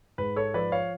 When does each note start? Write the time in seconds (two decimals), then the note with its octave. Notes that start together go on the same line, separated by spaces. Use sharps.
0.18 G#2 B4
0.36 A4 C#5
0.54 F3 B4 D5
0.72 C#5 F5